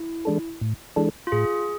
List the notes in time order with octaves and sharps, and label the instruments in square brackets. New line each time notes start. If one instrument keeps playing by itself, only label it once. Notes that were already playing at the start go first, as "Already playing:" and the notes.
Already playing: [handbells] E4
[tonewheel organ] E3 G#3 D4 A4
A2
E3 G#3 D4 A4
[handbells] F4
[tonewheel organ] A2 [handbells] G#4